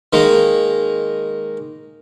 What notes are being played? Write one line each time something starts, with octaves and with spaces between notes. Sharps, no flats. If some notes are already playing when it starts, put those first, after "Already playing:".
D#3 G#3 A#3